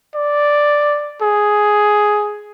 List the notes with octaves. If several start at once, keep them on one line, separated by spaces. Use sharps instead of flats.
D5
G#4